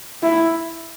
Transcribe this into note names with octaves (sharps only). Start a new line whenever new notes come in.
E4